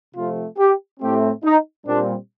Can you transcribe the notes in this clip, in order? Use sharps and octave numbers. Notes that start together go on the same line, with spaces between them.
C3 F3 A3 C4 F4
G4
A2 A3 C4 G4
D#4
A#2 G3 C4 D4